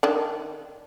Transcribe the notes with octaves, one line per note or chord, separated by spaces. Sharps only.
D#3 D4